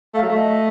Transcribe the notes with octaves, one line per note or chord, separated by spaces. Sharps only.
A3 F5
F#3
A3
D#5